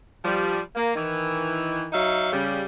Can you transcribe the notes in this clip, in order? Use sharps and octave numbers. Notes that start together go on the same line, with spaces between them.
F3 G3
A#3
D#3 E3
F#3 D#4 E5 F5
C#3 G3